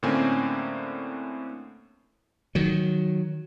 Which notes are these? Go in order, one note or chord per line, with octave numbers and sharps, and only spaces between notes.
A2 D3 A#3 C4 C#4 G#5
D#3 F#3